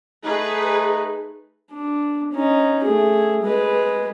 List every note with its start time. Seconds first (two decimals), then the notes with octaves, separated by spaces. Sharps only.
0.24 A3 D#4 G#4 B4
1.72 D4
2.33 C#4 D#4
2.84 A3 G#4
3.42 G#3 B4